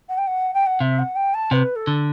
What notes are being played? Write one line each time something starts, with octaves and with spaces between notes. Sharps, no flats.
F#5
G5
F#5
G5
F#5
C3 E5
F#5
G5
A5
C3 B4
A4
D3